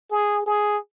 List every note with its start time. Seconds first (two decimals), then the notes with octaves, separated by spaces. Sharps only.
0.11 G#4
0.46 G#4